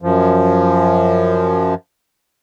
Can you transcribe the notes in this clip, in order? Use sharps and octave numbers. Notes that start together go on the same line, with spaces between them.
F#2 F3